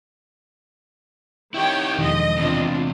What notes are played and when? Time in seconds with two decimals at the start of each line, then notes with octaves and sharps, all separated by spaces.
1.54 D#3 E4 G4 C#5 G5
1.99 E1 D3 D#3 F3 G#3 D#5
2.38 E2 C3 C4 D4 F4